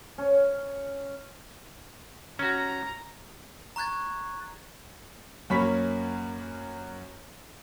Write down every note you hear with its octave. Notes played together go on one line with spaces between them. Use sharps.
C#4
C#4 F#4 A#5
A#5 C#6 F#6 G#6 A6
F#2 A#3 C#4 B5 C#6 B6